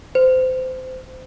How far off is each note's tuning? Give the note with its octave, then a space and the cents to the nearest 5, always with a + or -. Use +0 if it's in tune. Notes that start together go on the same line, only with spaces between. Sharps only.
C5 -25